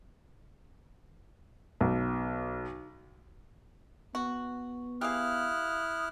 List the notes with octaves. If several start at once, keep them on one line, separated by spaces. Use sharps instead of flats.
B1
B3 F#4
E4 G4 G#4 F5 D#6 F6 F#6